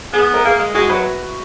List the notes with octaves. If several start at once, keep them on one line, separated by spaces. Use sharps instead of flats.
B3 G#4
A#4
A#3 G#4
G#3
G#3 F#4
F#3 B4